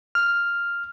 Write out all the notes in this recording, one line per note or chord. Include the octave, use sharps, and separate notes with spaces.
F6